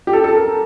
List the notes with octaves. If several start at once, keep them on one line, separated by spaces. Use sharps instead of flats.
G4
A4
A4
A#4